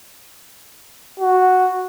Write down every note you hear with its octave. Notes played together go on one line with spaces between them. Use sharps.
F#4